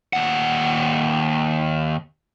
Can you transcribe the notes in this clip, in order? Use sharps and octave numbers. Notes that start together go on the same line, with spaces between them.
D#2 F#5